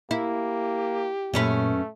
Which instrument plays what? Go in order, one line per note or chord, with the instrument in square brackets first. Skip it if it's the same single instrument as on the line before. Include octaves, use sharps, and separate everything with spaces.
[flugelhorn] A#3 [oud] E4 [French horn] G4
[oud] F#2 C#4 B4 [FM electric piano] A#2 [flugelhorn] A3